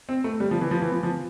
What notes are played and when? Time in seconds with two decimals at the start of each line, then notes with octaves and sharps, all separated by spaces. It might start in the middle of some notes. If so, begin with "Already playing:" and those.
0.09 C4
0.24 A3
0.40 G3
0.51 F3
0.61 E3
0.71 F3
0.82 E3
0.92 F3
1.03 F3